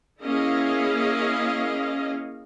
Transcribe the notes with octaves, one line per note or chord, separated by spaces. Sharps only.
A#3 C#4 E4 G#4 D#5 F5